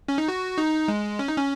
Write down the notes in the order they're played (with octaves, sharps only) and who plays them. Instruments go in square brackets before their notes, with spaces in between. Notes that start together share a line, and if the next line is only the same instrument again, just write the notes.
[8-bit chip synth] C#4
D#4
F#4
D#4
G#3
C#4
D#4
C#4